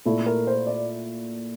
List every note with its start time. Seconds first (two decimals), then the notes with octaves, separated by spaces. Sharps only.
0.05 A#2 A3 E4 A4
0.26 A#4
0.47 C5
0.67 D5